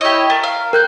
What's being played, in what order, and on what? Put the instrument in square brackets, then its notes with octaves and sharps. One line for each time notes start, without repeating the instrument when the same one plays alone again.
[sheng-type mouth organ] E4 C#5 E6 [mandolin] G4 D#5
[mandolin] A3 [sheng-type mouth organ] A#4
[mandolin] F5
[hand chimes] A#4 F#6 G6 [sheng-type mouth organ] G5